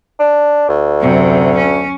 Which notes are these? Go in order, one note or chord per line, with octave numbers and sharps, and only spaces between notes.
D4
D2
F#2 C3
C#4